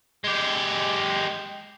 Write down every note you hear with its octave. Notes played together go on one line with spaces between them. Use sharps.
G#3 G4